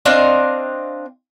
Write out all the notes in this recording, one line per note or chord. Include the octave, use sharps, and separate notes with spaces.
C4 D4 D#5 F5